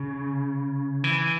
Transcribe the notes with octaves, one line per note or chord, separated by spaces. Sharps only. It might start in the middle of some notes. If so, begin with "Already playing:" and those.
Already playing: C#3
E3